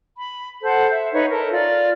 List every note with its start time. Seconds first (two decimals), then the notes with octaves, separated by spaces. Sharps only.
0.16 B5
0.63 A4 C5 F#5 G6
0.89 E5
1.12 D#4 B4 C#5
1.31 A4 A#4
1.51 F4 D5